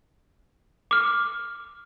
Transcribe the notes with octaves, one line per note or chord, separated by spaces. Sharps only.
D6 F6